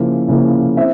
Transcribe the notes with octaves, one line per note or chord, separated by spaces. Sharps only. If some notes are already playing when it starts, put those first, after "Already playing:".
Already playing: C#3 F3 A#3 E4
C#3 F3 A#3 E4
C4 E4 E5